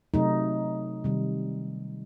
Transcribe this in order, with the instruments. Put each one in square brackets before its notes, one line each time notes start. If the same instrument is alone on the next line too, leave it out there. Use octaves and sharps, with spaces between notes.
[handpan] C3 F#3 A3 D#4
C3 D#3 G3